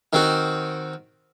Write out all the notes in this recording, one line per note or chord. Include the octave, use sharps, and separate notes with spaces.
D#3 C4 F#4